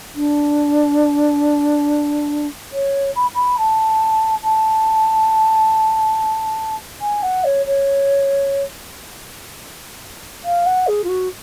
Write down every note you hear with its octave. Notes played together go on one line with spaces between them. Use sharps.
D4
C#5
B5
B5
A5
A5
G#5
F#5
C#5
C#5
F5
F#5
G#4
F4
F#4